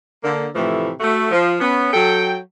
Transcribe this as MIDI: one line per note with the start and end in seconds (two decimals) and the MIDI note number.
0.24 0.48 50
0.24 0.48 58
0.55 0.91 45
0.55 0.91 48
0.55 0.91 52
0.55 0.91 53
0.55 0.91 57
1.00 1.27 57
1.00 1.27 66
1.31 1.56 53
1.60 1.92 59
1.60 1.92 61
1.93 2.36 54
1.93 2.36 69
1.93 2.36 79